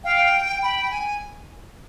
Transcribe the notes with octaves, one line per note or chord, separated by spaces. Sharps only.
F5 G5
G5 B5
G#5